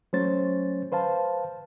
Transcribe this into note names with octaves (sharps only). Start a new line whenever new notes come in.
F#3 A3 C#4 C5 C#5 A6
B4 C5 F5 A5